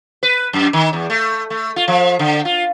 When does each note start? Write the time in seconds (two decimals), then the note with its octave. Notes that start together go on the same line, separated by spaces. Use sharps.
0.23 B4
0.53 F#2
0.73 D#3
0.93 E2
1.10 A3
1.50 A3
1.76 F4
1.88 F3
2.19 D3
2.45 F4